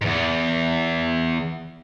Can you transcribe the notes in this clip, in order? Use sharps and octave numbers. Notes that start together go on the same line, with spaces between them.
E2 G#2